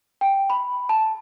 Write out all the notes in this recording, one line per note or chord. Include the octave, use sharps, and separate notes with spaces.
G5
B5
A5